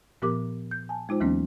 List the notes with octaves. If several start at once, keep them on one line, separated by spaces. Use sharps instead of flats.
A#2 F3 B3 G4 A#4 D6
G6
G#5 A5
G#3 D#4 F4 C5
D#2 E3 F#3 A#3 B3 C#4